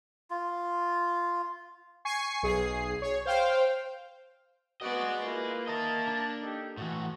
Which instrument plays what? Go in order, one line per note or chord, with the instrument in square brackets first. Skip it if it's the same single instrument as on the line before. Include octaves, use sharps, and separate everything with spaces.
[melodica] F4
[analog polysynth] G#5 C#6 C7
B1 G#4 C7
C#5
C5 F5 G5
[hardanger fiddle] B3 D5 [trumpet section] F#4 [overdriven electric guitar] G#4 D#5
[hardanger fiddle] A#3 [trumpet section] E4 F4 B4
[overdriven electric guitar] A#4 D#5 [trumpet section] E5 A5 A#5
[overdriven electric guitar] D4
[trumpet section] D#4 G4 A4
[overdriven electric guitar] A2 E3 [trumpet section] F#4